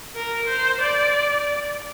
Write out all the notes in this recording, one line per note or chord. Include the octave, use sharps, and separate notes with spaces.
A#4
C5
D5